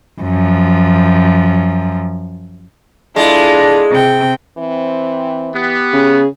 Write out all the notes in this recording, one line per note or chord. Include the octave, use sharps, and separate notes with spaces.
F#2 F3
G#3 D4 E4 F4 A4
C3 G5
E3 C4
B3 G4
C#3 G#4